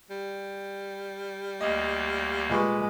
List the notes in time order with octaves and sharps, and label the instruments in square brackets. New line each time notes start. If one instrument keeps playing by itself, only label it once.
[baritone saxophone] G3
[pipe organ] D2 A#3 [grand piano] D#5
[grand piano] A#2 B4 C#6 [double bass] G#3